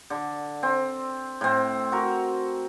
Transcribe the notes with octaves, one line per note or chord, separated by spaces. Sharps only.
D3
C4
A2 C4
F#4 A#4